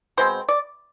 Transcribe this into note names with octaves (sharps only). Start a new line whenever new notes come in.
B2 G#3 C4 C5
D5